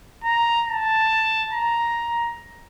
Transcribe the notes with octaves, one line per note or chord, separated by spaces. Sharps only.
A#5
A5
A#5